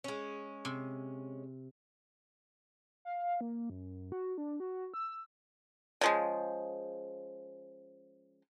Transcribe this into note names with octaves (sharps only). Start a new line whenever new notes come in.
G#3 C#4
C3
F5
A#3
F#2
F#4
D4
F#4
E6
C#3 F3 G#3